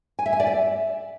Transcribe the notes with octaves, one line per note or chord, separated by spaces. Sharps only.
G#5
E5
G#5
D5
E5